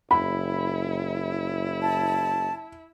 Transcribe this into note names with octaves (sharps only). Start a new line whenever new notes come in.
F#1 E4 B5
A5